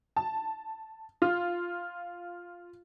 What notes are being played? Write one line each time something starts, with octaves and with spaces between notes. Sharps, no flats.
A5
F4